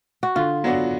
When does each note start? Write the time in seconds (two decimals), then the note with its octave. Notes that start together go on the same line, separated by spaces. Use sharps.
0.23 F#4
0.35 D3 F4
0.64 F#3 B3 D4 F#4